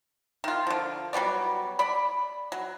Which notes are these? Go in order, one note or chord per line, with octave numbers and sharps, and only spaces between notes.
D#3 F4
D3 F3
F#3 G3 B3 D5
D5 B5
F#3